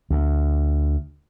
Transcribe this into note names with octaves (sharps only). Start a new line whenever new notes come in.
D2